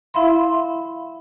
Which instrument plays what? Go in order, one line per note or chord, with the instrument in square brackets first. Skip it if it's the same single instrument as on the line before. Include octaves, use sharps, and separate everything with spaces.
[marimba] E4 E5 F5 B5 C6